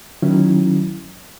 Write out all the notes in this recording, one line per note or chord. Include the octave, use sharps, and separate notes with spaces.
D#3 F#3 C#4 E4